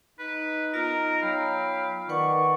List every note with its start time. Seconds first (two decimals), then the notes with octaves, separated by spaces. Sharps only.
0.20 D#4 B4
0.74 B3 F4 A#4
1.22 F#3 F5 G5 B5
2.09 D#3 B4 D5 F#5 C#6